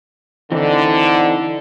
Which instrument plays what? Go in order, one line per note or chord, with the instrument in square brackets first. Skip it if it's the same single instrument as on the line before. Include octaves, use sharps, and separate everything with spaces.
[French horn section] D3 [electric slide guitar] E3 C4 D#4